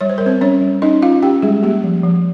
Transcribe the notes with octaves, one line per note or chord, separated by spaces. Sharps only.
G3 C#5
C5
G3 A#4
C4 C5
G3 C#4 C#5
G3
C#4 D#4 D#5
C#4 F4 F5
C#4 G4 G5
G3 G#3 G#4
G3 A#3 G4
F3
F3